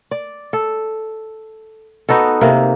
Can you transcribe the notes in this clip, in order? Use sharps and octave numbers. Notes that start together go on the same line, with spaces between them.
D5
A4
B3 D#4 F#4 A4
C3 A#3